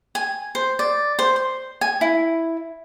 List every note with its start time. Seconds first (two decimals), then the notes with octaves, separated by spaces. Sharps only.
0.15 G#5
0.55 C5
0.79 D5
1.19 C5
1.36 C5
1.81 G#5
2.01 E4